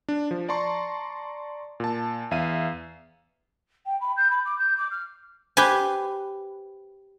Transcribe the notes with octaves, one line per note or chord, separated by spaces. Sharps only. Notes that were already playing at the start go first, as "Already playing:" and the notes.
D4
F3
D5 A5 A#5 C6 C#6
A#2 A5
E2 E5 F5 D#7
G5
B5
G6
B5
D6
G6
D6
F6
G4 B4 C5 G#5